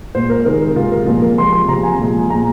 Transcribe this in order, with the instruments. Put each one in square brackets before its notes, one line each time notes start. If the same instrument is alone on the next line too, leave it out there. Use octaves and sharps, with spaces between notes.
[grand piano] A#2 G#3 C5
A#4
C3 D#3 G#3 A#4
A#4
C3 G#3 F4
A#4
A#2 F3 G#3 F4
A#4
C3 F3 G#3 C6
C6
C3 F3 G#3 A#5
G#5
A#2 F3 G#3
A#2 G#3 A#5